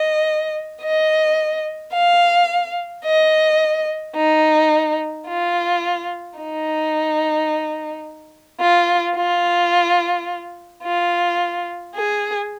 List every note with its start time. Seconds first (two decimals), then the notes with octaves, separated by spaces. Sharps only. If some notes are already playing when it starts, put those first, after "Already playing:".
Already playing: D#5
0.82 D#5
1.93 F5
3.05 D#5
4.16 D#4
5.28 F4
6.39 D#4
8.61 F4
9.17 F4
10.84 F4
11.95 G#4